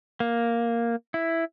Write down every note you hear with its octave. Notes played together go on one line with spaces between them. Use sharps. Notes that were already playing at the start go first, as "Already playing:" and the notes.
A#3
E4